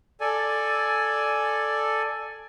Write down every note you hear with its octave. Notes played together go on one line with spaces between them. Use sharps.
A4 D5 G#5